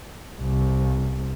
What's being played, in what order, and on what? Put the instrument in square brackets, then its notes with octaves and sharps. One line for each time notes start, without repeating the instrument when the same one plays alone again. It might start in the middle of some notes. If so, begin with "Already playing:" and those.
[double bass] C2